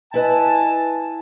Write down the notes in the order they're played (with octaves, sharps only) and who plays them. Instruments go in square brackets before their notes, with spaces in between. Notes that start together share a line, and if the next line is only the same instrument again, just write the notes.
[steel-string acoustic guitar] E4 B4 D#5 [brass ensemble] G#5 A5